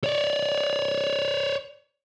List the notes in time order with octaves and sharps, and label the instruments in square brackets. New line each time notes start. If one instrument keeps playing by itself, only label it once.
[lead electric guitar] C#5 D5